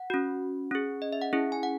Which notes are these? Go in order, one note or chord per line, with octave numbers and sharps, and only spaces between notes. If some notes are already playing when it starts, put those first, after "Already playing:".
Already playing: F#5
C#4 F#4
C#4 G#4
D#5
E5
F#5
C#4 E4 G#4
G#5
F#5